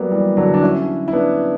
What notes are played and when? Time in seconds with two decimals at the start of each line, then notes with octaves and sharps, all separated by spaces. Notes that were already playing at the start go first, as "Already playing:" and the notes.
Already playing: F#3 G3 A#3 B3
0.12 E3 G3
0.37 D3 F#3
0.54 D4
0.63 C#4 E4
1.08 E4
1.13 B3 D4